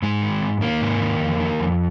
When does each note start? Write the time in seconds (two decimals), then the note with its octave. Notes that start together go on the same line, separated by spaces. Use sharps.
0.02 G#2 G#3
0.22 D#3
0.42 G#2
0.61 D#3 A#3
0.81 G#2
1.01 D#3
1.20 F2
1.40 D#3
1.60 F2